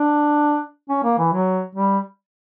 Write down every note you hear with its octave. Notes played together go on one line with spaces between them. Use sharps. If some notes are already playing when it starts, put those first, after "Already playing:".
Already playing: D4
C#4
A#3
E3
F#3
G3